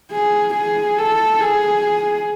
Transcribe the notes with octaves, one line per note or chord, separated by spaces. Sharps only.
G#4
G#4
A4
G#4